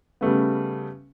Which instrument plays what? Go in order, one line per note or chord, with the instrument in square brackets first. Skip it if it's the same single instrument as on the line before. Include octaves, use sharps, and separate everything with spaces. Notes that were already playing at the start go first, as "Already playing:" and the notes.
[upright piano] C#3 G3 A3 B3